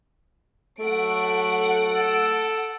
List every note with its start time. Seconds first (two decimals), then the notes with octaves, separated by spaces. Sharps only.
0.80 F#3 A3 F#5 D7
1.89 A4